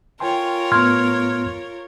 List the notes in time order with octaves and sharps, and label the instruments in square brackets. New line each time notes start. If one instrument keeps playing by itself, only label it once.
[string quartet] F4 A#4 C#5 [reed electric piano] G5 G#5 C6
[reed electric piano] A2 B3 [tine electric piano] C6 F6 G#6